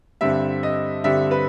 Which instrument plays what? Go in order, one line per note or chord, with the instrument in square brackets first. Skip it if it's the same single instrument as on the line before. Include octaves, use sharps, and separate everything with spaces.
[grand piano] G2 D3 G3 C4 E5
D#5
G2 D3 G3 C4 E5
B4